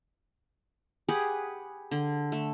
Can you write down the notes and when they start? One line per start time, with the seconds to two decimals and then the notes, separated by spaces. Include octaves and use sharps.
1.08 G4 G#4 B4 F#5
1.91 D3
2.32 A3